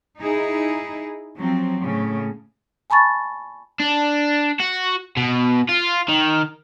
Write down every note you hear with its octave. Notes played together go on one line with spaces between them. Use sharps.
D#4 E4 G#4
F3 F#3 C4
A2 C#3
G#5 A5 B5 C#6 A6
D4
F#4
B2
F4
D#3